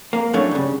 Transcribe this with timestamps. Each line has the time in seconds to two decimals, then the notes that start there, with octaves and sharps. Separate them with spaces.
0.13 A#3
0.33 F#2 A2 A3 D4 C#5
0.51 G2 C#3